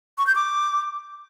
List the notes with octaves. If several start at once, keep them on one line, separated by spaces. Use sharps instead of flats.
C#6
G6
D6